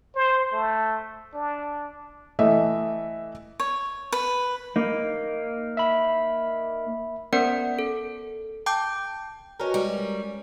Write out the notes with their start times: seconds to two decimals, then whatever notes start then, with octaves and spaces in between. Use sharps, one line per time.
0.16 C5
0.53 A3
1.34 D4
2.39 E3 A3 D#5 E5
3.60 C#5
4.12 B4
4.76 A#3 D#4
5.77 E5 B5
7.33 B3 C#4 A#4 C5 D5 F#5
7.79 A4
8.66 G5 A5 D6 G6
9.60 C#4 F#4 A#4 B4 D#5
9.74 G3 G#3